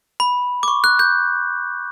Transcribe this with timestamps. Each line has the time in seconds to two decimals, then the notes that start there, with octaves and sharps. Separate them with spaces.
0.20 B5
0.63 D6
0.68 C#6
0.84 F#6
0.99 G6